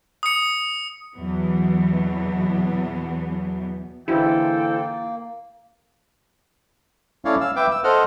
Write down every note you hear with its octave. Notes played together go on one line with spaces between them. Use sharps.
D#6 C#7
E2 B2 E3 F#3 B3
G#2 D3 E3 A#3 E4 A4 G5
A3 C#4 E4 C#5 D5 F5
F5 E6
B4 E5 G5 D6
E6
A4 C5 D#5 F#5 F6